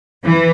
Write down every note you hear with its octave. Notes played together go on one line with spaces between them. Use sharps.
E3